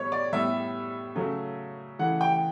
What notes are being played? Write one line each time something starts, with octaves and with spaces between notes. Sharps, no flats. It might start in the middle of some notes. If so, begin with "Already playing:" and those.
Already playing: A2 G3 B3 C#5
D5
A2 G3 B3 E5
C#3 F#3 A3
C#3 E3 A3 F#5
G5